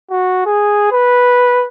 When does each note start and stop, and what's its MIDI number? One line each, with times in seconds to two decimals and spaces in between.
0.10 0.43 66
0.46 0.91 68
0.92 1.67 71